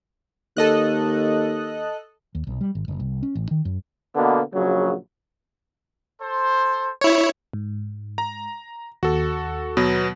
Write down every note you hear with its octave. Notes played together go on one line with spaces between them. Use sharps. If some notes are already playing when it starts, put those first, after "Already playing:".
D#2 A4 D#5 F#6
D#2
B1
G3
G#1
F#1
C2
C#4
A1
D#3
F#2
B2 D3 A#3 B3
A#1 C#3 F#3
A4 C5
E4 C#5
G#2
A#5
D#2 F#4 A4
B2 F#3 B3